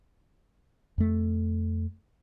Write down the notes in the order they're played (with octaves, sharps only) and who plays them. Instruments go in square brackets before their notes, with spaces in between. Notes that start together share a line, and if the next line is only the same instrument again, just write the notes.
[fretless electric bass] F2 A3